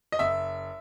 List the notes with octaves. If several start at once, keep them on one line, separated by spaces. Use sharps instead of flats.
D#5
F#1 E5